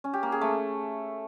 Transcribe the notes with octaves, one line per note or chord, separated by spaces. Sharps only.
C#4
G4
A#3
G#4
A3